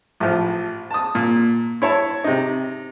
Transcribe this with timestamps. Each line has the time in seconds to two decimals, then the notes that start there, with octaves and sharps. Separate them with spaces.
0.20 A1 F3
0.91 A5 D#6
1.15 A#2
1.82 E4 C#5 A5
2.24 C3 D#4